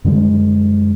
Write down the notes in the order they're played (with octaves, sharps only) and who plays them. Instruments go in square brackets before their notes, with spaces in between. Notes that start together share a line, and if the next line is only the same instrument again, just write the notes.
[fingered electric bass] F#2 D3 G3 G#3